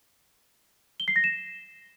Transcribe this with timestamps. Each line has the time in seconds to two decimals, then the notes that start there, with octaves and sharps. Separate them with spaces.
1.00 G7
1.08 C7
1.16 A#6
1.24 E7